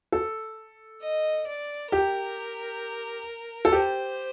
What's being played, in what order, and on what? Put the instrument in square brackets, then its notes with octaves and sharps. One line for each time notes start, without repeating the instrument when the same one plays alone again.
[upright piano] A4
[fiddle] D#5
D5
[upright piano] G4 [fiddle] A#4
[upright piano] A4
[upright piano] G4 [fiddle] C5